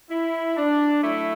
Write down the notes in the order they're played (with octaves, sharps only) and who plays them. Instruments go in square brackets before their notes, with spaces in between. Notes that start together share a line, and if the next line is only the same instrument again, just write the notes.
[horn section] E4
D4
F#3 A3 E4